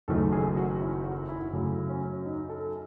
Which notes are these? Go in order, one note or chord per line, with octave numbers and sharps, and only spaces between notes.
F#1 F#2 D#3 A3 A4
G#4
F#4
E4
F#4
E4
F#2 C#3 F#3 A3
C#4
D#4
A4